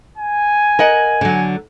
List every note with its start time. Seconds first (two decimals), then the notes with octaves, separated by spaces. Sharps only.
0.17 G#5
0.79 A#4 D#5 F#5
1.21 D3 F#3